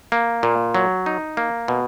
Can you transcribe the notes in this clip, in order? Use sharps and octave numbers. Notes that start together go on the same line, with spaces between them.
A#3
A#2
F#3
D#4
A#3
B2